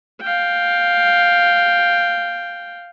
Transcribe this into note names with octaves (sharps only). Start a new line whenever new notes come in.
F5 G5